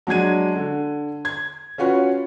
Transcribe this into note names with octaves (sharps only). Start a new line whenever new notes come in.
F#3 G#3 D4 G#6 D#7
D3
G#6
C#4 F4 F#4 B4 C#5